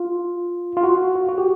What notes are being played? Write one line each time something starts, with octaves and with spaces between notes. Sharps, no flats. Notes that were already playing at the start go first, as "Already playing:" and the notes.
Already playing: F4
F4
F#4
F#4
F#4
G4